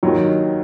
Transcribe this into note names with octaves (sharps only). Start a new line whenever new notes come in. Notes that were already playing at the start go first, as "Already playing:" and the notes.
D#2 D#3 F#3